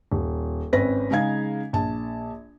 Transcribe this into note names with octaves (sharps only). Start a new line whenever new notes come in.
D#1
G#1 C4 C#4 B4 A#6
C#3 G#3 D#4 F5 G#6
A#1 A5